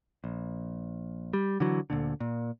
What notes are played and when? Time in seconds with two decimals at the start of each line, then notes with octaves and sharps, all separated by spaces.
0.24 A#1
1.33 G3
1.60 D3 E3 F#3
1.90 D2 A#2 D3
2.20 A#2